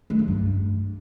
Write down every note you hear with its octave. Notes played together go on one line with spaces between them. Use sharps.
G#3
F3
G2